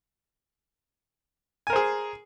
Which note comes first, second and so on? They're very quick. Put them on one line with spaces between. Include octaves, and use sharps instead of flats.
G#5 A#4 C5 G#4